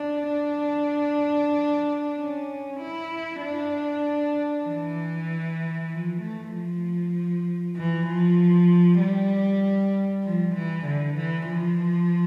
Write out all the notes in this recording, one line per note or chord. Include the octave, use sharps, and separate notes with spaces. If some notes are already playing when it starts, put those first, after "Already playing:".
Already playing: D4
D4
C#4
E4
D4
E3
F3
A3
F3
E3
F3
G3
F3
E3
D3
E3
F3